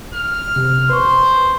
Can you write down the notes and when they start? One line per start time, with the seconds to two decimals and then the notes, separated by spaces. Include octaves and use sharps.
0.14 F6
0.56 C3
0.90 B4 C5 C#6